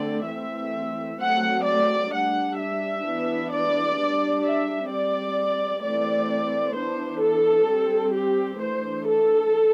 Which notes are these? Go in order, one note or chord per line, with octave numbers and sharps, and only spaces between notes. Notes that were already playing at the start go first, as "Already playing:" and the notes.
Already playing: D3 A3 C4 D5
E3 A3 C4 E5
F#3 A3 C4 F#5
D5
G3 D4 F#5
E5
E3 B3 D4
D5
G3 D4
E5
G3 C4 D5
E3 A3 C4 D5
E3 B3 D4 C5
A4
G3 C4
G4
E3 A3 D4 C5
A4